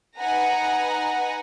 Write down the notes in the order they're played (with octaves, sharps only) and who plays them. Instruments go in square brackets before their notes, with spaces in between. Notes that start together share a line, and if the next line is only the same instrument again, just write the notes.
[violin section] D#4 B4 F#5 G#5 A#5